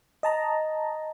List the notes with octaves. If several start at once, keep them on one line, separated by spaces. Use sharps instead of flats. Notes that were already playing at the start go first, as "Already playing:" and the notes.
D#5 A5 A#5